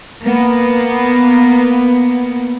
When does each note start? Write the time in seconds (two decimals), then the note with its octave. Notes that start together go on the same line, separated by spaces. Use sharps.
0.22 A#3 B3